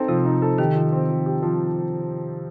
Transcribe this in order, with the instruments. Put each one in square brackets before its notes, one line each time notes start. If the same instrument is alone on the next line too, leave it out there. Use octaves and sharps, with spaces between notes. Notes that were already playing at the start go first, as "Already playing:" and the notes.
Already playing: [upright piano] C4 D#4 A4
[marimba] C3 [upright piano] F3
[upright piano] D#4
A4
[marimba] D#3 [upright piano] G4
[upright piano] F3
C4
F3
G4
F3